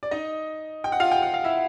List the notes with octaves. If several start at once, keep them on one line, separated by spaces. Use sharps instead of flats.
D5
D#4 D#5
G5
F#5
F4 F5
G5
F#5
F5
E4 E5